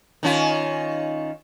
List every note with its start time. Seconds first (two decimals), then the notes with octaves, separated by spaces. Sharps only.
0.23 D#3 C#4 F4